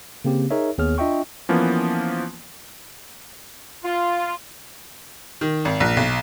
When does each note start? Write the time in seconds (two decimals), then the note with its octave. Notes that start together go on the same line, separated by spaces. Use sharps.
0.25 C#3 A#3 C4 G4
0.50 D#4 G#4 A#4 C#5 E5
0.78 D#2 B3 G#4 C#5 F6
0.98 D4 F4 D#5 E5 G5 C#6
1.49 E3 F3 A#3 B3 C#4
3.84 F4
5.41 D#3
5.65 G#1
5.80 A#1
5.97 B1